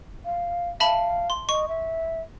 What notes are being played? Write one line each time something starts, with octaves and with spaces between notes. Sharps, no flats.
F5
E5 F5 A5 B5
C6
D#5 C#6
E5